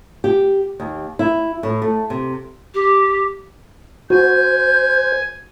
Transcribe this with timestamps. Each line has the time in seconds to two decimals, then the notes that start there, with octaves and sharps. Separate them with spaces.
0.24 G4
0.80 D#2
1.19 E4
1.63 A2
1.82 A3
2.10 C3
2.74 G4
4.10 F#4 C5 G#5 G6